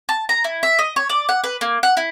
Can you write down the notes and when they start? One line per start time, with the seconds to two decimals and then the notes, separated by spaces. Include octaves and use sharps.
0.09 A5
0.29 A#5
0.44 E4
0.63 E5
0.79 D#5
0.96 C#5
1.10 D5
1.29 F#5
1.44 B4
1.61 A#3
1.83 F#5
1.97 E4